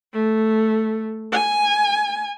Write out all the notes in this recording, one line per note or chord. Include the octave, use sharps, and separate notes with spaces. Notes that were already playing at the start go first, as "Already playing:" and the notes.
A3
G#5